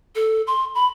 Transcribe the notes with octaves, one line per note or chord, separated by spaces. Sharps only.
A4
C6
B5